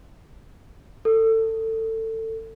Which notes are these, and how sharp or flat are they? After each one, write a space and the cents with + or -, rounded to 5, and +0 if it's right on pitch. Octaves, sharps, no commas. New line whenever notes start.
A4 +25